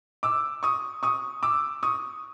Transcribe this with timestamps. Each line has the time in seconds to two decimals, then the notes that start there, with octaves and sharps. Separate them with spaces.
0.23 D6 E6
0.63 C#6 D#6
1.03 C#6 D#6
1.43 D6 E6
1.83 C#6 D#6